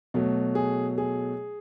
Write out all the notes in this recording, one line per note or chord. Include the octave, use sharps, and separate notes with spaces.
B2 F#3 A3
G#4
G#4